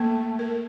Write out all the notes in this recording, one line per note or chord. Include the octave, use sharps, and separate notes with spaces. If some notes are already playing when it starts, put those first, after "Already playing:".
Already playing: A3 A#3
A#4